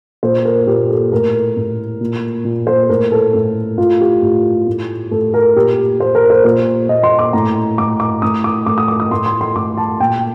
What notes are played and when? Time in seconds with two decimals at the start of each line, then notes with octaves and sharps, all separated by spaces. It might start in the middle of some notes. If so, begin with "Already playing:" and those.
0.23 A#2 C5
0.45 A#4
0.67 A#2 G4
0.89 A4
1.12 A2 A#4
1.57 A2
2.01 A#2
2.45 A#2
2.67 C5
2.89 A2 A#4
3.12 A4
3.34 A2
3.78 A2 F4
4.01 G4
4.22 A2
4.67 A2
5.11 A2 A4
5.34 A#4
5.56 A#2 G4
6.00 A#2 C5
6.15 A#4
6.30 C5
6.44 A#2 C5
6.89 A#2 D#5
7.03 C6
7.19 D6
7.33 A2 A#5
7.78 A2 D6
8.00 D6
8.22 A2 D#6
8.44 D6
8.66 A2 D6
8.78 D#6
8.88 D6
9.00 D#6
9.11 A2 C6
9.26 C6
9.41 C6
9.55 A2 D6
9.77 A5
10.00 A#2 G5